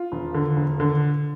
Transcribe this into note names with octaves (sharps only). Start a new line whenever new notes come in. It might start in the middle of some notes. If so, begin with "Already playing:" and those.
Already playing: F4
E1
D3
E1
D3